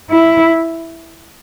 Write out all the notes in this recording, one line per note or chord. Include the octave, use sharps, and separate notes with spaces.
E4